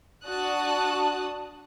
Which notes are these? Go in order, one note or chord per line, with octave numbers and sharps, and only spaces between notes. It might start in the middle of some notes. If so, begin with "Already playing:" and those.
D4 F#4 A5 D#6 F#6